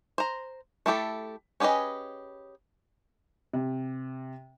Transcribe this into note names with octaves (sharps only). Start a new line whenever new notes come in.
C5 A#5
A3 E4 G4 A4
C#4 G4 G#4 B4 D#5
C3